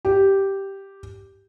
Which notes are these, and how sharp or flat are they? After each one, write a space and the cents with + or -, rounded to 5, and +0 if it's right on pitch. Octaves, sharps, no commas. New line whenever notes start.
G4 -5